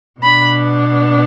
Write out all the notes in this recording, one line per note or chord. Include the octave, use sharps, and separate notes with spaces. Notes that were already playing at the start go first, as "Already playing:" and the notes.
B2 B3 D4 B5